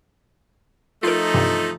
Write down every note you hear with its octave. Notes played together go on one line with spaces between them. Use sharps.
F3 A3 D#4 F4 A#4
G2 C3 E3